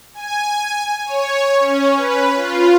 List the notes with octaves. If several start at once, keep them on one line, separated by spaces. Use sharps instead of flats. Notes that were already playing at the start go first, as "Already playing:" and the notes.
G#5
C#5
C#4
B4
F4